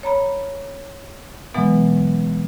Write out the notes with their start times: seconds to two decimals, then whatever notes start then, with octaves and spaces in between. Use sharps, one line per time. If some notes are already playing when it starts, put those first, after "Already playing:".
0.03 C#5 A#5 B5
1.54 B2 E3 F#3 G#3 B3